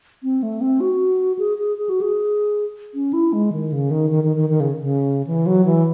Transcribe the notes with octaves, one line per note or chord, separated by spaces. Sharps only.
C4
A3
C4
F#4
G#4
G#4
G#4
F#4
G#4
C#4
E4
G#3
D#3
C#3
D#3
D#3
D#3
D#3
D#3
C#3
C#3
E3
F#3
E3